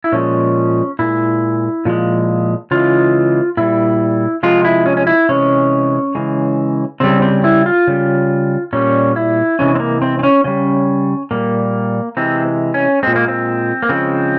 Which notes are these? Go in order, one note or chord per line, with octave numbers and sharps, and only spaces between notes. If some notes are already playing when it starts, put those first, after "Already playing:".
E4
A#2 F3 G#3 C#4
A#2 G#3 E4
A#2 F3 G#3
C#3 E3 G#3 F4
A#2 G3 E4
C3 F3 G#3 F4
E4
C#4
C#4
E4
C3 E3 G#3 C#4
C#3 E3 G#3
C#3 G3 C4
C4
E4
F4
C#3 G3
A#2 G3 C#4
E4
C3 E3 G#3 C#4
C4
A#3
C4
C4
C#4
C#3 G3 C#4
A#2 G3 A#3
C3 E3 G#3 C4
C#4
A#2 G#3 C4
A#3
C4
A#3
C#3 F3 G#3 C4